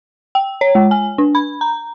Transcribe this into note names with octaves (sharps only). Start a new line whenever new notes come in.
G5
C#5
G#3
G#5
D4
B5
A#5